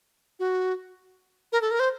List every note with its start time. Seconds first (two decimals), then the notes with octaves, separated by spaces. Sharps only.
0.39 F#4
1.52 A#4
1.62 A4
1.71 A#4
1.80 C5